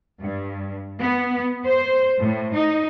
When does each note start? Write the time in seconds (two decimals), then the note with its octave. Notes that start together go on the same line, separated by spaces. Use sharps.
0.20 G2
1.00 B3
1.66 C5
2.20 A2
2.54 D#4